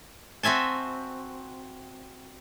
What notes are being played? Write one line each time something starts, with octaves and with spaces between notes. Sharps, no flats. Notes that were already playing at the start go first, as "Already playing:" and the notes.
C4 F#4 E5 G#5 A5